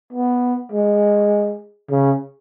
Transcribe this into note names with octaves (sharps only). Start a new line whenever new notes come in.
B3
G#3
C#3